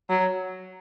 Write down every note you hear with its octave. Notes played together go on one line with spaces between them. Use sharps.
F#3